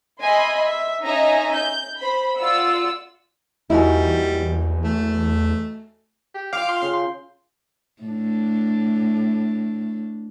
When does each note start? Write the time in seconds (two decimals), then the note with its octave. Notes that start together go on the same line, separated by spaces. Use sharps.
0.22 D#5 E5 G#5 B5 C6
0.60 E5
1.03 C#4 D#4 D#5 E5 G#5 A#5
1.55 G6
2.00 C5 B5
2.38 F4 D5 F#5 E6
3.70 E2 G3 A#3 D#4 E4 F#4 G#5
4.84 A3
6.35 G4
6.53 F4 F5 G5 D6
6.69 C6
6.82 C#3
6.93 C6
8.03 A2 D4